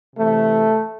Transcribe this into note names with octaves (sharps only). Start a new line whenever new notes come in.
C3 E3 A3